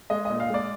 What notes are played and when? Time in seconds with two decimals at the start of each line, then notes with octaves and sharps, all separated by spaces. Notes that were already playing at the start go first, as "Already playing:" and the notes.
0.10 G#3 D#5
0.25 A#2 D#5
0.40 F5
0.50 G#3 D5